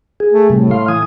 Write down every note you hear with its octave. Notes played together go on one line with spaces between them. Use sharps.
G#4
A3
A2 C3 G3 A3
F5 C6
E3 G#5 D#6